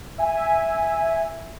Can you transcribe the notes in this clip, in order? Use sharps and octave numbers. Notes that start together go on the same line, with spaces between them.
E5 G#5